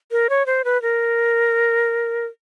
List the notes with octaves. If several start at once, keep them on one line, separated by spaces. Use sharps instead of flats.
A#4
C#5
C5
B4
A#4